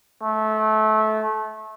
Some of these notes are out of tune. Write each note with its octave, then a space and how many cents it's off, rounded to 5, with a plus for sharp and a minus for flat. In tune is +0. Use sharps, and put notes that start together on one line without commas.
A3 -25